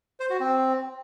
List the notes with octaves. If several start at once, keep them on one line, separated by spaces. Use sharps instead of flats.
C5
F#4
C4